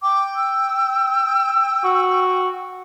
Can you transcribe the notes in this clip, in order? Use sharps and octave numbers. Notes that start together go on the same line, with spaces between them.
G5 D6
E6
F#4